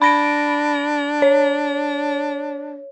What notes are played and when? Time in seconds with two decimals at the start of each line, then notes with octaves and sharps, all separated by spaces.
0.02 D4 B5 A#6 D7
1.22 C#5